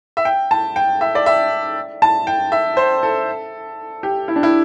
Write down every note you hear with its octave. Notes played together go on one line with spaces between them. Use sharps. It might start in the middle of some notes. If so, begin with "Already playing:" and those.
E5
G5
A5
G5
E5
D5
E5
A5
G5
E5
C5
A4
G4
E4
D4
E4